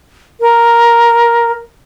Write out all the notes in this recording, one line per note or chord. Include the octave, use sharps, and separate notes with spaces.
A#4